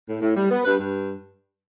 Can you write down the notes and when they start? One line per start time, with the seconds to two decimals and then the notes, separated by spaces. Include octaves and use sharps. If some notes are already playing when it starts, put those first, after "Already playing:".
0.08 A2
0.22 A2
0.36 G3
0.51 B3
0.65 G2 B4
0.79 G2